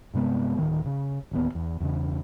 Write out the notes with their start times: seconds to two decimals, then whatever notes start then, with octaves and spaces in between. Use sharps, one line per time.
0.14 G2 C3 G#3 B3
0.58 D1 D#3
0.86 C#3
1.31 D1 D#2 B3
1.55 E2
1.80 E2 G2 C#3